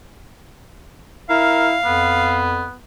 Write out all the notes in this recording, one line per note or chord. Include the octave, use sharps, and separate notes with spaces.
E4 A#4 F5
F2 B3